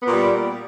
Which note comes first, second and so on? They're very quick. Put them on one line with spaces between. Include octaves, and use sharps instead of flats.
B3 A#2 G3